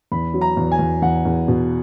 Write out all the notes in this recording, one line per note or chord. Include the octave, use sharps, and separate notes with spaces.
E2 B5
F#3
A#5
E2
G#5
E2
E2 F#5
E2
B2